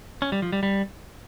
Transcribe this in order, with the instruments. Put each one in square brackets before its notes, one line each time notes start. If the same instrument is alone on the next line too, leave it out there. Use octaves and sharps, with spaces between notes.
[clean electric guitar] C#4
G3
F3
G3
G3